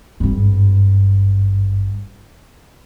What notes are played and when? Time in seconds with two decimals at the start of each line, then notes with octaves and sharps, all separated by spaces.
0.20 G#1 G2